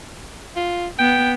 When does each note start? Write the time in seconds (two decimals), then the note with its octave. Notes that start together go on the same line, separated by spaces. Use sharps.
0.56 F4
0.99 B3 G5